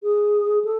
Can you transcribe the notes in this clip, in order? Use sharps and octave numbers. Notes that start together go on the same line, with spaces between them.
G#4
A4